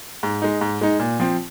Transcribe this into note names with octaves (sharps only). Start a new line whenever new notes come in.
G#2
G#3 D#4
G#2
G#3 D#4
A#2
F3 C4